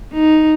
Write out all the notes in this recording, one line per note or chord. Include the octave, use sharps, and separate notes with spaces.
D#4